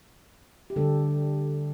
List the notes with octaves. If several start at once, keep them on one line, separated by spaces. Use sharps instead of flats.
G4
D3 G3 A4